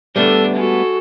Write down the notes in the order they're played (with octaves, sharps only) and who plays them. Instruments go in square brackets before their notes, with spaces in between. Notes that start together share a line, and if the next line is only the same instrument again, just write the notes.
[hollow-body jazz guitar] G3 A3 B3 [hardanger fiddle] D4 [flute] A4
[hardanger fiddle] G#3 A4 [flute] F#4